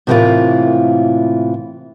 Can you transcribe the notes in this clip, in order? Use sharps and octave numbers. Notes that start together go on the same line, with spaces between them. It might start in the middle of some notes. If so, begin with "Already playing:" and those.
A2 C3 E3 A#3 E4 F4